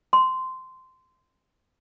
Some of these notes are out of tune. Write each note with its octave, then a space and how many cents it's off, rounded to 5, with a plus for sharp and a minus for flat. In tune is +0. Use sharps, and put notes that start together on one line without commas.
C6 -15